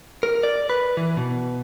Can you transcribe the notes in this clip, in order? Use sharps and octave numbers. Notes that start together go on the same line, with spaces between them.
A#4
D5
B4
E3
B2